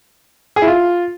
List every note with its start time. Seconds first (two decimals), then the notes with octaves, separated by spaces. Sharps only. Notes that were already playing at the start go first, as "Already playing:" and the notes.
0.56 G#4
0.62 E4
0.67 F4